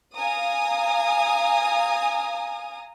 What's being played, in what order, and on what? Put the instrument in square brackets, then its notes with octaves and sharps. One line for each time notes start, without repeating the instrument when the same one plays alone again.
[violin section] F5 G#5 A#5 D#6